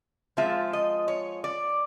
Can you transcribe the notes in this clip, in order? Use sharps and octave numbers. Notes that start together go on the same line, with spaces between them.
F3 G#3 C4 F4 E5
D#5
C#5
D5